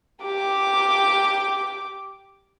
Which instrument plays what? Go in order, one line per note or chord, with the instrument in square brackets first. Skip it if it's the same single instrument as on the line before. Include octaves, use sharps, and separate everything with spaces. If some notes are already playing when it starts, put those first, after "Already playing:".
[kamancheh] G4 D6